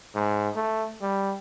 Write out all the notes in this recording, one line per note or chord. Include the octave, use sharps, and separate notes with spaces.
G#2
A3
G3